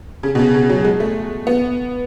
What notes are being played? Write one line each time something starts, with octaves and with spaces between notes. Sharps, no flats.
C#3
B2
C#3
C#3
F#3
G#3
A3
B3